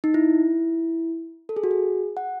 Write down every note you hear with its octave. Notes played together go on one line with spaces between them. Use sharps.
D#4
E4
A4
G#4
F#4
G#4
F#5